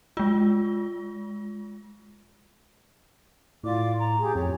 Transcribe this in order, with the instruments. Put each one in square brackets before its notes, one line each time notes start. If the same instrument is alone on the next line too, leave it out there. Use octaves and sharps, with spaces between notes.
[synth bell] G#3 F4
[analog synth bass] A2 [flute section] F4 D5 D6
[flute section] A#5
G4 G#4
[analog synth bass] F2 [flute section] C#5